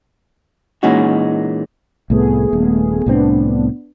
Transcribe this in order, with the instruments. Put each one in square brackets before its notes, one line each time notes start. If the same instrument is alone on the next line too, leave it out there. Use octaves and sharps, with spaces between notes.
[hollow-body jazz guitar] A#2 E3 G#3 C#4 D#4 F#4
[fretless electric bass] C2 A2 [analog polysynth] A3 B3 G#4
[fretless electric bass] D#1
[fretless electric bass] C2 A2 C4 [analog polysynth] B3 D4